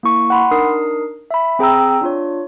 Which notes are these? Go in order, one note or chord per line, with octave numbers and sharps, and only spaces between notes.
A#3 E4 C#6
F#5 B5 C6
D4 D#4 A#4 D#6 C7
E5 B5
C4 G#4 G5 A#5 E6
D4 F4 C#5